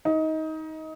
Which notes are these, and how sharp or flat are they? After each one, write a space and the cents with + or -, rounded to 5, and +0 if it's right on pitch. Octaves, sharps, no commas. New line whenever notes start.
D#4 +20